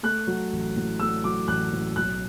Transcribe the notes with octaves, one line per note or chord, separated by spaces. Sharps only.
A3 F#6
F#3
A1
A2
A3 E6
F#3 D6
A1 F#6
A2
B1 F#6